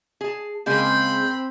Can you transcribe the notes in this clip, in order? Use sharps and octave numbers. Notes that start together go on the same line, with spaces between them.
G#4 A5
C#3 G#3 A#3 C4 B5 C6 G6